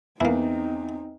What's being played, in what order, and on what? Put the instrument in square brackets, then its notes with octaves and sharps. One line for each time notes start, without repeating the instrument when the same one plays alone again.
[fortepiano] E2 [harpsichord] A#3 E4 [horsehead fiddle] C4 D#4